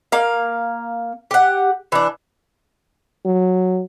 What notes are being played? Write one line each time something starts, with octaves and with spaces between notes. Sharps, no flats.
A#3 F5
G4 F#5
E3 D4
F#3